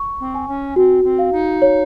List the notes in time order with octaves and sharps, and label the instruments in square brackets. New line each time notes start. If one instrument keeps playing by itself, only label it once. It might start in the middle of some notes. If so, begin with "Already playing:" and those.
Already playing: [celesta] C#6
[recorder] C4
[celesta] G#5
[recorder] C#4
[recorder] C4 [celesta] F#4
[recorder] C4
[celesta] F5
[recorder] D#4
[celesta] C#5